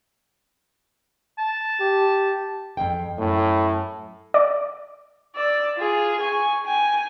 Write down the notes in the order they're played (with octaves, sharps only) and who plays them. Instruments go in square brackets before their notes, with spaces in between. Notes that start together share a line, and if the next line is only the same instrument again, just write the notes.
[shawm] A5
[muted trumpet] G4
[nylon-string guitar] F2 G#2 G5
[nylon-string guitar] F#2 [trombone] A2
[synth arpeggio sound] D5
[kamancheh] D5 E6
F4 G#4
G#5 C#6
G5 G#5